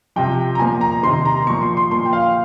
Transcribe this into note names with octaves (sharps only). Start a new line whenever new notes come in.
C3 F3 G5
A#5
A#2 F3 G#5
A#5
C3 D#3 C6
A#5
A#2 F3 C#6
C6
C6
A#2 F3 C6
G5
F5